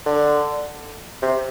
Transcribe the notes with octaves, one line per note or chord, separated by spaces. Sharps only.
D3
C3